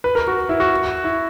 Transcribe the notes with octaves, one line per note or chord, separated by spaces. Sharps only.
B4
A#4
F#4
E4
F#4
E4